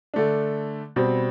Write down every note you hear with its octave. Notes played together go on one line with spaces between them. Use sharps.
D3 A3 D4
B2 G3 C4